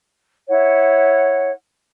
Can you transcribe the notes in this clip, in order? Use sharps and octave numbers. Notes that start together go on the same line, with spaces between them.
E4 C#5 F#5